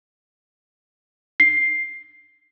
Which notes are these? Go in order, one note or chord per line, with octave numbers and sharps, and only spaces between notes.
C7